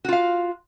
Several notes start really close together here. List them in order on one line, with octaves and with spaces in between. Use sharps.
F#4 F4 F5